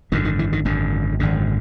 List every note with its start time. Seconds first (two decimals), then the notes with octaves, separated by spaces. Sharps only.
0.12 G#1 F#2 D3 D#3
0.25 D#3
0.39 E3
0.53 D#3
0.65 G#1 F#2 D3
1.20 G#1 F#2 D3